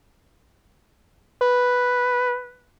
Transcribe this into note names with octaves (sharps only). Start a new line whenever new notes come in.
B4